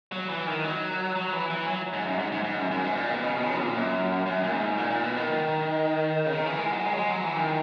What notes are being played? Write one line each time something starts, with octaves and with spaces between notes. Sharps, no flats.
F#3
E3
D#3
F#3
F#3
E3
E3
F#3
G#2
F#2
G#2
G#2
G#2
F#2
F#2
G#2
A#2
B2
C#3
B2
F#3
A#2
F#2
F#2
A#2
G#2
A#2
A#2
B2
D#3
C#3
D#3
E3
G#3
F#3
G#3
F#3
G#3
F#3
E3
D#3